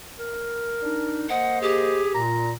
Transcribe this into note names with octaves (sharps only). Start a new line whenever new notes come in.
A#4
D4 D#4
A#3 C5 D#5 F#5
G4 G#4
A#2 A#5